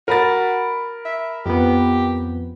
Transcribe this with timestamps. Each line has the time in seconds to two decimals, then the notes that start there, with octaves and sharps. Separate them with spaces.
0.08 F#4 A#4 B5 A6
1.05 E5
1.46 F2 B3 G4